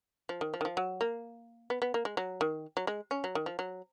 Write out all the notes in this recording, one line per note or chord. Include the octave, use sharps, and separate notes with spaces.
F3
D#3
F3
D#3
F3
F#3
A#3
B3
B3
A#3
G#3
F#3
D#3
F#3
G#3
C#4
F#3
D#3
F3
F#3